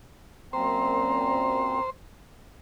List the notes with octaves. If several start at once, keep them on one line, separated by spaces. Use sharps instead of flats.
F#2 A#2 C4 C5 A#5